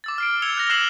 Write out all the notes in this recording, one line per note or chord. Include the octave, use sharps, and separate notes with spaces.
D6 E6 A6
F6 C7 D7
E6 G#6 C#7 F7 G7
F#6 A#6 G7
D6 F#6 C7 E7 F#7